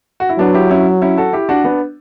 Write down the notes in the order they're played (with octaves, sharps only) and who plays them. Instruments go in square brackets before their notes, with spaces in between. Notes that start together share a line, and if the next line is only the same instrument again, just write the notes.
[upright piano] F#4
E4
[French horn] F#3 [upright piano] B3 D4
[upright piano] E4 G4
C#4 E4
C#4 E4
F#4 A4
E4 G4
D4 F#4
B3 D4